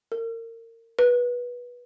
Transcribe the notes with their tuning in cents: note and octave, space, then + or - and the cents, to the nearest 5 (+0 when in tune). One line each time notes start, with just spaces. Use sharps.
A#4 -30
B4 -20